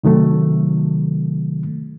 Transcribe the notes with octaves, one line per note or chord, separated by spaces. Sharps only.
C3 D#3 F#3 A3